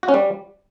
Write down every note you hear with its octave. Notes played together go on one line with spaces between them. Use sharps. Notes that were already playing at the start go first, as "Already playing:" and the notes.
F#4
C#4
G3